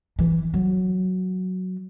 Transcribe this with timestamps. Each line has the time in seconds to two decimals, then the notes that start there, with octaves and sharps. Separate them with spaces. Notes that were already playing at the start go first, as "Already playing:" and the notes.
0.19 E3
0.54 F#3